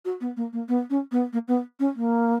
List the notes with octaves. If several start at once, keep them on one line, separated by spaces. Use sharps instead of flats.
F#4
B3
A#3
A#3
B3
C#4
B3
A#3
B3
C#4
A#3